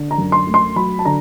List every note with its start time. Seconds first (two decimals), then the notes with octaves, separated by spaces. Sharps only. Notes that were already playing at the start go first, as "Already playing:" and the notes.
Already playing: D3
0.11 A#5
0.18 F#2
0.32 C6
0.47 A3
0.54 C6
0.76 F#3 B5
0.99 A5
1.05 D3 A#5